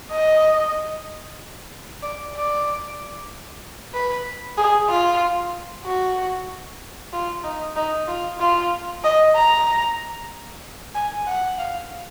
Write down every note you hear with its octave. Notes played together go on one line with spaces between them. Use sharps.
D#5
D5
D5
B4
G#4
F4
F#4
F4
D#4
D#4
F4
F4
D#5
A#5
G#5
F#5
F5